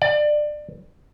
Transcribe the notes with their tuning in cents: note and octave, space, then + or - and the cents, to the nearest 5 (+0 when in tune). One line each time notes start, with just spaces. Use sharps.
D5 +25